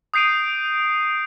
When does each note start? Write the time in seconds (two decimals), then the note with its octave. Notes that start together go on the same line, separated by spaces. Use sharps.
0.14 D#6 G6 C7 D7 D#7